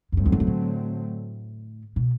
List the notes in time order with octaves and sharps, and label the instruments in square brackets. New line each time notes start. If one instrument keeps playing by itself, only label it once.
[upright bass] F#2
[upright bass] G2 [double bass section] D3 F#3 A3 C4
[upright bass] E2
F#2
G2
A2
B2